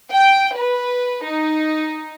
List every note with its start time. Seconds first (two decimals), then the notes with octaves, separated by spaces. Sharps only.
0.12 G5
0.56 B4
1.25 D#4